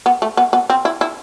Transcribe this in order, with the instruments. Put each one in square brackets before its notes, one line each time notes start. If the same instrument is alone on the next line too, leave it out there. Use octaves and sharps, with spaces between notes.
[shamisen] B3
A3
B3
B3
C4
E4
E4